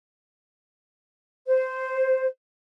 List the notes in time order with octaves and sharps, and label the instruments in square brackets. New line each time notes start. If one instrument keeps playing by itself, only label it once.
[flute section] C5